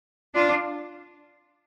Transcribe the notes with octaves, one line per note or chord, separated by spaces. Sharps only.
D4 F4